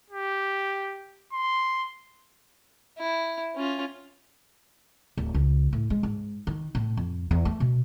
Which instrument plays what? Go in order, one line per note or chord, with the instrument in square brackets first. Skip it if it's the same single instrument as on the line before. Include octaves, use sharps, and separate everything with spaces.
[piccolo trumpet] G4
C6
[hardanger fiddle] E4
C#4 F4
[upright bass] D1
C#2
A2
G#3
G#2
D#3
A2
F2
E2
A3
B2